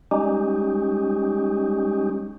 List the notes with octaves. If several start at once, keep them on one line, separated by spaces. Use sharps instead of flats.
G3 G#3 C#4 D#4 G4